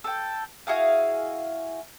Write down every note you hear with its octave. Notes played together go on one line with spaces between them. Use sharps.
A4 G5
E4 F#4 G#4 F5